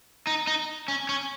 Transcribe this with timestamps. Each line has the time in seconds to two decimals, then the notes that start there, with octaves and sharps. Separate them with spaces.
0.27 D#4
0.47 D#4
0.88 C#4
1.09 C#4